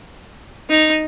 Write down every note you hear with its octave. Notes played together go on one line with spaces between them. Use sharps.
D#4